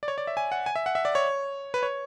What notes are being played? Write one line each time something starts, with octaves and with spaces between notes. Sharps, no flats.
D5
C#5
D5
E5
G#5
F#5
G#5
E5
F#5
E5
D5
C#5
B4
C#5